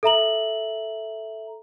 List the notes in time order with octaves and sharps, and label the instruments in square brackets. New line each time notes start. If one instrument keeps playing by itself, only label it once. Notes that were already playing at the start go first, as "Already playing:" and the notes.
[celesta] A4 E5 A#5 F#7